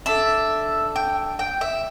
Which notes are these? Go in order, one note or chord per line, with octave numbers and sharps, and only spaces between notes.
D4 A4 E5
G5
G5
E5